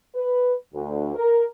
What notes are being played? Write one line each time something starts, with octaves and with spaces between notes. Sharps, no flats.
B4
D2
A#4